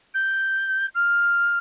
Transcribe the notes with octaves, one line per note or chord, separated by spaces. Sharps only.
G6
F6